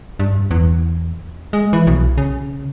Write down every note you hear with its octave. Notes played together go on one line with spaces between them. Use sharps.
G2
E2
G#3
E3
B1
C#3